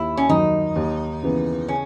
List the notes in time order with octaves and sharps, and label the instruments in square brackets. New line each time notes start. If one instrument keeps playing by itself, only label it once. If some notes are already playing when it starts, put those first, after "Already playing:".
Already playing: [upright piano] D#2 [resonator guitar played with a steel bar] E4
[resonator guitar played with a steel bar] C#4
[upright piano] D#3 F#3 [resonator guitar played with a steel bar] D#4
[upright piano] D#2
C#3 E3 B3
[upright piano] C#3 [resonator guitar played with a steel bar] C#4